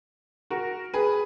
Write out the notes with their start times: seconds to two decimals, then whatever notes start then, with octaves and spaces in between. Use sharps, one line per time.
0.50 F#4 A#4
0.94 G#4 B4